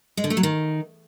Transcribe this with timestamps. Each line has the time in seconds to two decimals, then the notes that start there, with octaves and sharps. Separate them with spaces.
0.17 G#3
0.24 D3
0.30 A3
0.37 F#3
0.43 D#3